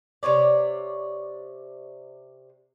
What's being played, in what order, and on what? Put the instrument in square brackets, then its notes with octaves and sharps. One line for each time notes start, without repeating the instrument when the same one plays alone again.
[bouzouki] C3 E3 C#5 D5